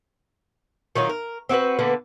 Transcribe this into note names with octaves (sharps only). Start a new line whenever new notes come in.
D#3 F#3 D#4 F4
A#4
C4 F#4 G#4 B4
D3 A#3 B3 B4